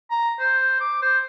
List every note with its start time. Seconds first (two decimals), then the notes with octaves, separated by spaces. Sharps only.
0.11 A#5
0.40 C5
0.81 D6
1.02 C5